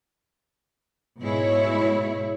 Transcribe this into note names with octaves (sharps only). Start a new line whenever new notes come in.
G#2 B2 G#3 E4 C#5